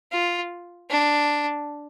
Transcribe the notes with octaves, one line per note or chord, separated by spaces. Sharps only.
F4
D4